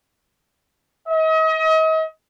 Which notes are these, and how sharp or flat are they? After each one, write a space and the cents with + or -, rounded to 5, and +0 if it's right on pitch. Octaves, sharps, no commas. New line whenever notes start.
D#5 +40